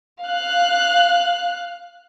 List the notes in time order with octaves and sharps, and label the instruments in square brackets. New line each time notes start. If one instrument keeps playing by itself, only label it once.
[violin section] F5 F#6